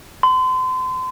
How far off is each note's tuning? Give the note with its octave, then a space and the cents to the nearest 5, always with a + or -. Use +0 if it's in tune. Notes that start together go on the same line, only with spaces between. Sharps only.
C6 -35